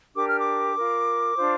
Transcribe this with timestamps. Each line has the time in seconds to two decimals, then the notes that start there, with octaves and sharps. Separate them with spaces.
0.14 D4 G4 A#4 D6
0.26 F6
0.39 D6
0.75 F4 A#4
1.36 D4 F4 C5